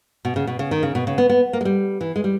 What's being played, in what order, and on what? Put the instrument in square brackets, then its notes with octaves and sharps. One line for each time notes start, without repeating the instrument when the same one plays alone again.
[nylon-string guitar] B2
C#3
B2
C#3
D#3
C#3
B2
C#3
B3
B3
A#3
G#3
G3
E3
G#3
G3